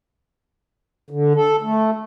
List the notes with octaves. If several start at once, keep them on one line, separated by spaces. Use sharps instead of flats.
D3
A4
A3